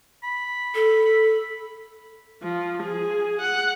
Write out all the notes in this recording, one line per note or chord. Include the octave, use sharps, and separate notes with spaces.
B5
A4
F3
G#4
F#5